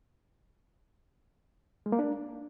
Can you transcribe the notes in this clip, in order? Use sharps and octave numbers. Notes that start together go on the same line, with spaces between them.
G#3
A#3
D4